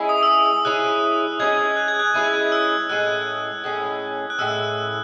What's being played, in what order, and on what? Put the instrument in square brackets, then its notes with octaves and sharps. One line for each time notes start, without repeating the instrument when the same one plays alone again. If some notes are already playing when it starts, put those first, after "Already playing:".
Already playing: [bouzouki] G#3 C#4 E4 G#4
[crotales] D#6
E6
D#6
D#6
[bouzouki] G#3 C#4 E4 G#4 [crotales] F#6
[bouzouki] G#3 C#4 E4 G#4 [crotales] G#6
[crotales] F#6
G#6
F#6
[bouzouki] G#3 C#4 E4 G#4
[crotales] E6
[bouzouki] A2 G#3 C#4 [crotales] F#6
[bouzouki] A2 G#3 C#4
[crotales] F#6
[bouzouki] A2 G#3 C#4 [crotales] E6